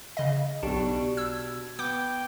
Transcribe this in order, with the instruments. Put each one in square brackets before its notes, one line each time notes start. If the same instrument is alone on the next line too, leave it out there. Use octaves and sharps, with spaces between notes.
[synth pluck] C#3 D#5
[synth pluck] B1 [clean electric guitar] B2 D4 [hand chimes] G4
[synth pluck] E6 [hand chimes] G#6
[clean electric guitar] B3 [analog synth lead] G5 [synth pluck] D6